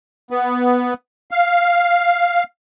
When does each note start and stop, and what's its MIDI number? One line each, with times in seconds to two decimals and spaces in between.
0.31 0.94 59
1.31 2.44 77